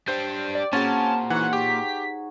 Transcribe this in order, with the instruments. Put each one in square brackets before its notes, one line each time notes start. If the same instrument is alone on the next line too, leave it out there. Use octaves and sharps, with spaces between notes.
[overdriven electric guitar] G3 D4 [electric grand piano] C5 G6 [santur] C#5 G5 E6
[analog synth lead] D5
[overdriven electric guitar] A#2 [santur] C4 F#4 G#4 [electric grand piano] C#4 [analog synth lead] A5
[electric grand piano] E3 [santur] D#4 F#4 C#5 [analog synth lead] F#5
[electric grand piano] G4 [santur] C#6 [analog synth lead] B6